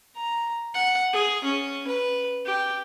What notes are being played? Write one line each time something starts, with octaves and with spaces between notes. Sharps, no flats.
A#5
F#5
G#4
C#4
B4
G4